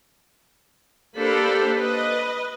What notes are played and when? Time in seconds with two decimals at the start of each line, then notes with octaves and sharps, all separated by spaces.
1.16 A#3 D4 G4 A4 C5 B5
1.78 B4 D#5